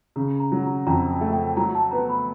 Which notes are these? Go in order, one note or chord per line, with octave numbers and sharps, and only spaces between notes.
C#3 A#5
A#5
F#3
A#5
F2 A#5
A3
G5
F#3 A#5
A5
B3 A#5
B5